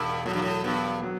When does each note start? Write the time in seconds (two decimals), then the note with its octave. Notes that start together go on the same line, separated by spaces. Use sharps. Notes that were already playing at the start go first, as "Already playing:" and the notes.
Already playing: E1 G2 D#3
0.26 A2 F#3
0.33 G2
0.42 A2
0.64 G2 B3
1.03 F#3